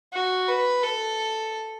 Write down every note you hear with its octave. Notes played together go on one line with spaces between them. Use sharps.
F#4
B4
A4